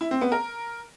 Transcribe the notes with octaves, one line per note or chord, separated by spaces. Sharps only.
E4
C4
B3
A#4